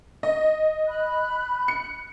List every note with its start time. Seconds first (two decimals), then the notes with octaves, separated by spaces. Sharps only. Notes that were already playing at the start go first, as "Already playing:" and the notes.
0.23 D#5
0.87 B5 F#6
1.68 C#7